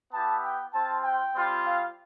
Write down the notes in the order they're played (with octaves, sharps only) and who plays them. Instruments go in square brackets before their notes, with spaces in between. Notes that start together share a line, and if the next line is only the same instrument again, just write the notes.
[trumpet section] B3 E4 G4 A5
G5
C4 F4 A5
G5
G3 C4 F4
F5